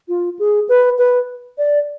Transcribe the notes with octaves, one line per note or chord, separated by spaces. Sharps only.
F4
G#4
B4
B4
D5